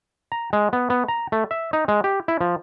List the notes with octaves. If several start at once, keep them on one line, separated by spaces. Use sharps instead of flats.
A#5
G#3
B3
B3
A#5
A3
E5
D#4
G#3
G4
E4
F3